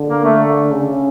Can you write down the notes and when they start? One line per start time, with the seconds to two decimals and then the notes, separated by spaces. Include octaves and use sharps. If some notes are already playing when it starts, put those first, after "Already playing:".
Already playing: D3
0.08 A#3
0.25 A3
0.71 C#3